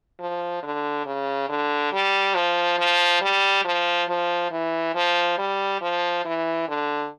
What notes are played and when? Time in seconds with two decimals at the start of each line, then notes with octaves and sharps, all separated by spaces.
0.20 F3
0.63 D3
1.06 C#3
1.49 D3
1.93 G3
2.35 F3
2.78 F3
3.22 G3
3.65 F3
4.08 F3
4.51 E3
4.95 F3
5.38 G3
5.81 F3
6.25 E3
6.68 D3